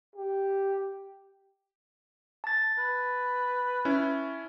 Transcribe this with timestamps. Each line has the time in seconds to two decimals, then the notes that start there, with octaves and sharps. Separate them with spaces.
0.16 G4
2.44 A5 A6
2.79 B4
3.85 C#4 E4